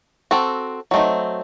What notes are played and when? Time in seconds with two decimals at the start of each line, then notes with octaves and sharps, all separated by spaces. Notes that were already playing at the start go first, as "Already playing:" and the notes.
0.31 C4 F#4 A4
0.91 F#3 A3 C4 D#4